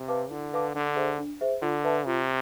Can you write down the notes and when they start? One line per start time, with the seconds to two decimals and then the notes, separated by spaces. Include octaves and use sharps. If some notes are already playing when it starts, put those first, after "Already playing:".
Already playing: C3
0.08 B4 F5 A5 D6
0.30 D3 E4
0.53 B4 F5 A5 D6
0.74 D3 D4
0.96 G#4 C5 E5
1.18 D4
1.41 G#4 C5 E5
1.62 D3 F4
1.84 B4 E5 A5
2.06 C3 F4